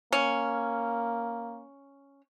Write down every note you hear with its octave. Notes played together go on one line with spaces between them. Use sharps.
A#3 C#4